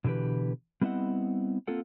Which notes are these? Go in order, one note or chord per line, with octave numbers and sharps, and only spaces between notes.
B2 D3 E3 G4 B4
G3 B3 C4 E4 D#5 F#5
A#3 C4 F4 A4 F#5